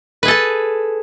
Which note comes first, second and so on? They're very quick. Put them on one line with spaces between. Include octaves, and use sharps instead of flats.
B4 G#4 A4 A5